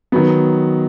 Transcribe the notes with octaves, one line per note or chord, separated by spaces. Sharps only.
D#3 F#3 B3